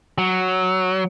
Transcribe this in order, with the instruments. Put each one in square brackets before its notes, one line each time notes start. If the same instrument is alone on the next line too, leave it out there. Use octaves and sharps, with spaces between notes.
[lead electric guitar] F#3